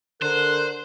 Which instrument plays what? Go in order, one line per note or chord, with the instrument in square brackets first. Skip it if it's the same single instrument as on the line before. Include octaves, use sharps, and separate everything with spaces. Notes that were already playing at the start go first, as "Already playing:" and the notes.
[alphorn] D3 [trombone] A#4 [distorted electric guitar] C5 [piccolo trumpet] F#6